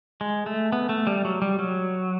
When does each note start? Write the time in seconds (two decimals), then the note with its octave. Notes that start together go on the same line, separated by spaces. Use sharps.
0.21 G#3
0.46 A3
0.72 B3
0.89 A3
1.07 G3
1.25 F#3
1.42 G3
1.59 F#3